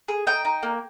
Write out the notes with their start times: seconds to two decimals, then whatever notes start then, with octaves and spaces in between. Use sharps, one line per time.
0.08 G#4
0.27 D#4 G5
0.45 D#4
0.63 A#3